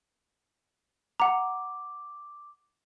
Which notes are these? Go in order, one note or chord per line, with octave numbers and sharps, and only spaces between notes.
F#5 A#5 D6